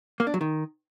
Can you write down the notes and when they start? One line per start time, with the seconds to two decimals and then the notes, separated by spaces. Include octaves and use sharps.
0.20 A#3
0.27 D4
0.34 F#3
0.41 D#3